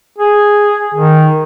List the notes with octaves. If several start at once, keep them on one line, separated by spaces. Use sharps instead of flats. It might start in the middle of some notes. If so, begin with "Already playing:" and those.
G#4
D#3